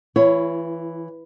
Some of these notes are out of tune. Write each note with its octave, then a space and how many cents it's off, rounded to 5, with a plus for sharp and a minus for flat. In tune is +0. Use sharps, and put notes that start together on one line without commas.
E3 +0 E4 +40 C#5 +5